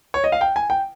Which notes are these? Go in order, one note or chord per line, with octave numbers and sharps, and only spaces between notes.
C#5
D#5
F5
G5
G#5
G5